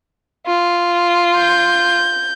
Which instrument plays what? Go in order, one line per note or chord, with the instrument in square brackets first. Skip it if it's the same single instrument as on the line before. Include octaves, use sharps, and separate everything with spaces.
[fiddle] F4
[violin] G6